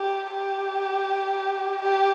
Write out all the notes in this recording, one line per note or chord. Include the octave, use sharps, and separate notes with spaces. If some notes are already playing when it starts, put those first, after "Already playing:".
Already playing: G4
G4
G4